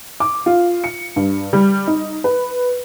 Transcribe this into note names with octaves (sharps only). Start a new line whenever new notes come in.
D6
F4
C#7
G2
G3
D#4
B4